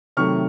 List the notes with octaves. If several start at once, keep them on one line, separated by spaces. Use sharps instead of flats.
C3 D#3 F#3 A3 C#6 F6